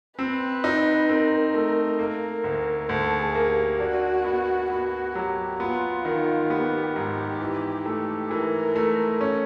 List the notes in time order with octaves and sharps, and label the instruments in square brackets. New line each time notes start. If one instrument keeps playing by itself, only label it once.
[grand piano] C4 [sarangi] B4
[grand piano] D#4
[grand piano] C4 [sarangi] A#4
[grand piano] A3
[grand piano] A#3 [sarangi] A#4
[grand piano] D2
[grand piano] D2 [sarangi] A4
[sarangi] G#4
[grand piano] A#3
[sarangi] G4
[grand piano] D4 [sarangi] F#4
[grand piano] B3
[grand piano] B3 [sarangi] F#4
[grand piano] F#3 [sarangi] G4
[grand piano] B3 [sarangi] F4
[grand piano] D#3
[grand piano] B3 [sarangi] G4
[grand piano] G#2
E3
A3
[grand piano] E3 [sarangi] A#4
[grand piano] A3
C#4